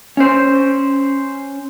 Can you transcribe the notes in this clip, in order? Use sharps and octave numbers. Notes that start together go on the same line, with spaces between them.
C#4 C5